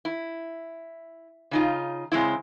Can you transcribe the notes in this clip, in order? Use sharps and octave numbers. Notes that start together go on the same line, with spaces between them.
E4
C#3 D#4 F4
C#3 G#3 C4 E4